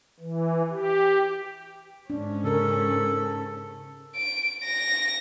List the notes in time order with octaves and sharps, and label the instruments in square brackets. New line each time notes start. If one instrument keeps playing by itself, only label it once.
[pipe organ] E3
G4
[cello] G#2 C#4 [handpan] D4
[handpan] C#3 A#4 [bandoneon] A4
[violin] D7
A#6